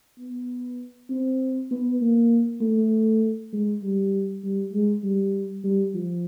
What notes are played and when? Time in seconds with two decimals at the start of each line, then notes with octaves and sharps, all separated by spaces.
0.19 B3
1.10 C4
1.71 B3
2.01 A#3
2.61 A3
3.52 G#3
3.82 G3
4.43 G3
4.73 G#3
5.03 G3
5.64 G3
5.94 F3